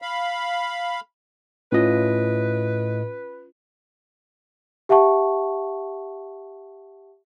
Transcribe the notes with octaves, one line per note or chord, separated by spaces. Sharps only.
F5 B5
A2 C#4 F4 B4 D#5
G4 E5 F#5 A5 C#6